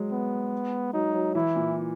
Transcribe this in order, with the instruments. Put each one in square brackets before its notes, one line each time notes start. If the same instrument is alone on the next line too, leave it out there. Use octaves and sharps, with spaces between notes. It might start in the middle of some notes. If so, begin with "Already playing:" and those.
Already playing: [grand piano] F#3 G#3
[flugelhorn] B3
[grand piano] F#3 [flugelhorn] D#4
[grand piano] F#3
[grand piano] E3 [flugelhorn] E4
[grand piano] A#2